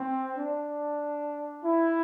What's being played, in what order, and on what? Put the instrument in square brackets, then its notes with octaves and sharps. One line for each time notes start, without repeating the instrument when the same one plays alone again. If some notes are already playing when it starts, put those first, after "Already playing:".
Already playing: [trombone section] C4
D4
E4